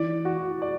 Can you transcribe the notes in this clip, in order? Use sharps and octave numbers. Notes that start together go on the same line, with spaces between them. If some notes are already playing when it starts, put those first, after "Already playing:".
Already playing: E3 D5
F#4
D5